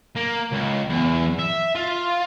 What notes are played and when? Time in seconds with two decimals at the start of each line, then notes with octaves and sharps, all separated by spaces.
0.16 A#3
0.51 C#2
0.89 E2
1.39 E5
1.75 F4